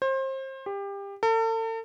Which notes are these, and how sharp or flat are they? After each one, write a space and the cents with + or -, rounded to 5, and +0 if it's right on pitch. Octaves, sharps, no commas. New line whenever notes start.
C5 +30
G4 +25
A4 +40